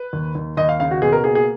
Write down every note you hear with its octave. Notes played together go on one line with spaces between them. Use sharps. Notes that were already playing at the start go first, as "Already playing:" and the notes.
Already playing: B4
D#2
D#2
D#2 D#5
F5
C#3 F5
F#4
B2 G#4
A#4
A#3 G#4
G#4